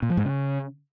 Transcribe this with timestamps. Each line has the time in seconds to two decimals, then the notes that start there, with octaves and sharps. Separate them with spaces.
0.02 A#2
0.10 F3
0.17 G#2
0.25 C#3